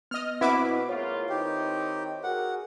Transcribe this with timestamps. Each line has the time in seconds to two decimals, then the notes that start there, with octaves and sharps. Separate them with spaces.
0.11 B3 D#5 F6
0.41 B2 C4 E4 B4 F#5 D6 B6
0.89 G#2 A#3 F4 C#5
1.29 D#3 C4 D#4 G4
2.24 F#4 G#4 A#4 F#5